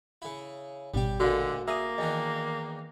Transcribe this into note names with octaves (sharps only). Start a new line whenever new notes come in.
C#3 E4
G#1 B2 G3 G4
D2 A#2 D3 D#4 F#4
A#3 G#4 E5 D#6
E2 D#3 D4 D#5